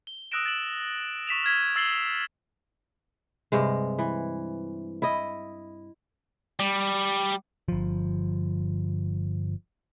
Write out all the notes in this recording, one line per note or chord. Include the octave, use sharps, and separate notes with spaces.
G7
D#6 E6 F#6 A#6 D7 E7
A6 E7 F#7
C#6 B6 E7 F7
F6 G#6 B6
E6 A6 C7 F#7 G7
G2 C3 G#3
E3
E4 D#5
G3
G1 F3